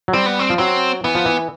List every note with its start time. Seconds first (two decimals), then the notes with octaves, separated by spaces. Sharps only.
0.08 F#3
0.13 G3 C4
0.26 B3
0.39 C4
0.50 F3
0.59 F#3 C4
1.04 E3 B3
1.15 F3
1.26 E3